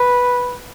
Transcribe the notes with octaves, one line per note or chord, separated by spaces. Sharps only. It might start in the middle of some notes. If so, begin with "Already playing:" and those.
Already playing: B4